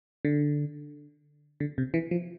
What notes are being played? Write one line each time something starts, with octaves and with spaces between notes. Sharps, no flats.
D3
D3
C3
E3
F3